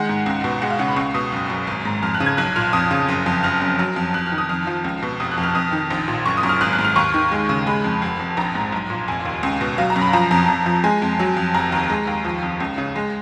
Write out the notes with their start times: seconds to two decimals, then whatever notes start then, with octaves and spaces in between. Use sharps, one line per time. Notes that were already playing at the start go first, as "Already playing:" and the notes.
Already playing: D#3 G#3 F#5
0.09 G#2
0.26 C#2
0.44 B2
0.62 G#3 F#5
0.70 F5
0.79 C#3 F#5
0.88 B5
0.96 C#2 C#6
1.14 B2 D#6
1.32 F#1
1.50 F#2
1.67 G#1
1.85 G#2
2.03 F2 F6
2.14 F#6
2.20 C#3
2.26 G#6
2.37 B1 F#6
2.56 A#2 F6
2.73 F2 D#6
2.91 C#3
3.08 F#1
3.26 F2
3.43 F#1 F6
3.61 F#2
3.79 F#3
3.96 F2
4.14 F2 F#6
4.26 F6
4.32 D#3
4.38 D#6
4.49 F2 F6
4.67 F3
4.85 C#2
5.02 B2
5.20 F1 D#6
5.31 F#6
5.38 F2
5.43 F6
5.55 F2 D#6
5.72 D#3
5.90 A#1
6.08 A#2
6.26 F#1 C#6
6.37 D#6
6.43 F#2
6.49 F6
6.61 G#1 F#6
6.73 F#6
6.79 G#2
6.85 F6
6.96 D#2 C#6
7.14 D#3
7.32 G#3
7.49 C#3
7.67 G#3 B5
7.84 F2
8.02 F1
8.19 F2
8.37 A#1 A#5
8.55 G#2
8.72 B1
8.90 A#2
9.08 F1 G#5
9.25 D#2
9.43 C#2
9.61 B2
9.78 F#3 F5
9.90 A#5
9.96 F#2
10.02 B5
10.13 F3 A#5
10.31 F2
10.48 F2
10.66 F3
10.84 G#3 G#5
11.02 F2
11.19 F#3
11.37 F2
11.54 F1 A#5
11.72 D#2
11.90 G#3
12.07 D#2
12.25 F3
12.43 F2
12.60 C#2
12.78 C#3
12.96 G#3